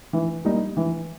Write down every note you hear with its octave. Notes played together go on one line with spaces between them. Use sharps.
E3
G3 A#3 D#4
E3